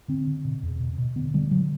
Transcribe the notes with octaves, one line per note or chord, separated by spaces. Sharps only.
D3 C4
D3
B2
E2
B2
B2
D3 B3
D3 G3
D3 F#3